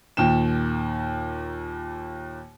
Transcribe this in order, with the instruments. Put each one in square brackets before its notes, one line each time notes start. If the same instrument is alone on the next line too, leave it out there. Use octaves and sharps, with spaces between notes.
[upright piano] D#2 A#2 G5 E7